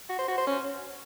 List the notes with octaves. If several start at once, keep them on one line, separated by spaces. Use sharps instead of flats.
F#4
C5
F#4
C5
C#4